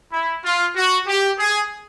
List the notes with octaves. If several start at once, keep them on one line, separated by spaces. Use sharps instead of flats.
E4
F4
F#4
G4
G#4